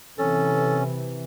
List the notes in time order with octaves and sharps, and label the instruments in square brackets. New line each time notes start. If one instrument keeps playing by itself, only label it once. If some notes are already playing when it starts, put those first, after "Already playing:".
[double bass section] C3 E3 [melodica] C#4 [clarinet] A4